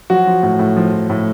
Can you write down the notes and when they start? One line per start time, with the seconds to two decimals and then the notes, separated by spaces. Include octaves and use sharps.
0.10 F3 F#3 F#4
0.27 F3
0.43 A2
0.59 A2
0.77 F3
0.92 F3
1.10 A2